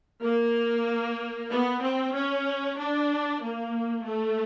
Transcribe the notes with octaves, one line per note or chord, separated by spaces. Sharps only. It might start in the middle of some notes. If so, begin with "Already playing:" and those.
A#3
B3
C4
C#4
D4
A#3
A3